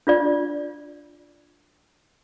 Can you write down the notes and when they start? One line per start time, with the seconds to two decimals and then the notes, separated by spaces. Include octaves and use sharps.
0.07 D4 F4 D5